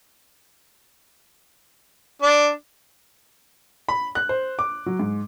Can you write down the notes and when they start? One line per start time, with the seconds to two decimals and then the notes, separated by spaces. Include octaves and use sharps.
2.22 D4
3.89 B5
4.15 F#6
4.29 C5
4.59 D6
4.86 F#3
4.99 G#2